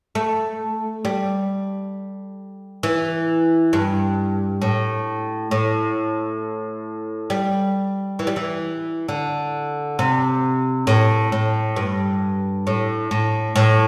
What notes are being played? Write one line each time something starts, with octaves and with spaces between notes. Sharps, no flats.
A3
G3
E3
G2
A2
A2
G3
E3
G3
E3
D3
C3
A2
A2
G2
A2
A2
A2